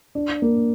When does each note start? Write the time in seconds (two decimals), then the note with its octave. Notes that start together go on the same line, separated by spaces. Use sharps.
0.15 D4
0.42 A#3